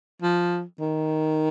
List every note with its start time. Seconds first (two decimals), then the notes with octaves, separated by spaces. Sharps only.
0.22 F3
0.80 D#3